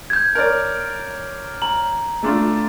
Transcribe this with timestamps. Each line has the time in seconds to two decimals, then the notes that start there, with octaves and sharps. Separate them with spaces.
0.10 G6 G#6
0.35 A#4 C#5 D5
1.62 A#5 F#7
2.23 A3 D4 F4